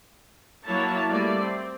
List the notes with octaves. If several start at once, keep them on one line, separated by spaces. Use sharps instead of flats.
F#3 A#3 E4 C#5 A5
G3 A3 A#3 D5
C4